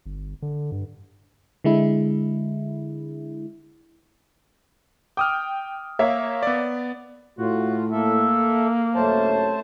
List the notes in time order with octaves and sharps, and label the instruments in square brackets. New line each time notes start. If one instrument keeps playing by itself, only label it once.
[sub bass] G1
D3
G2
[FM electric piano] D3 G#3 E4
[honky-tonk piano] G5 [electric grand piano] D6 D#6 F6
[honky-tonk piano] A#3 C#5 E5
[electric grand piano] B3 D5
[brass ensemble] A2 [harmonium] F4 [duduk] F#4
[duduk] A#3 [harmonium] A4 E5
[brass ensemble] C2 F#2 C#5 [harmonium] A3 C5 A5